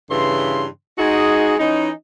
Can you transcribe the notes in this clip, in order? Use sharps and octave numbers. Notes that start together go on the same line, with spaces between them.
G2 C#3 E3 C6
G#3 D#4 F#4 G#4
E3 C#4 D#4